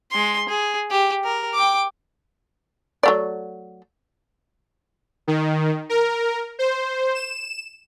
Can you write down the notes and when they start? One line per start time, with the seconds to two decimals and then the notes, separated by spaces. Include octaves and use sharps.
0.11 G#3 C6
0.49 G#4
0.90 G4
1.24 A#4
1.54 G5 D6
3.03 F#3 A3 D5
5.27 D#3
5.89 A#4
6.59 C5
7.15 E7